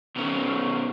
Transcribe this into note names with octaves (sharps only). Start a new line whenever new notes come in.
B2 D#3 C#4